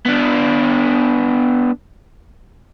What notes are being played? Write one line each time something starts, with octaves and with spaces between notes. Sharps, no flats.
B3 D4